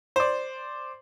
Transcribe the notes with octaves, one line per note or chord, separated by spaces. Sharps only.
C5 D5